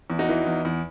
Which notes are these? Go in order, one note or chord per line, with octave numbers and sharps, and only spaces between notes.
E2
D#4 F#4
E3
E2
E2